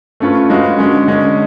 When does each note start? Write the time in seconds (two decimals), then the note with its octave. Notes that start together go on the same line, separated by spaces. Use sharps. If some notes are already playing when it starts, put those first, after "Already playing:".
0.20 A3 C#4 F4 B4
0.50 G#3 C#4 F#4 B4 F5
0.79 D3 G#3 C#4
1.07 D3 G#3 C#4